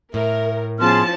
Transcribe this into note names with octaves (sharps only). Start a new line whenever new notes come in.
A2 A#4 E5
F3 B3 C#4 G#4 A5 C6 F6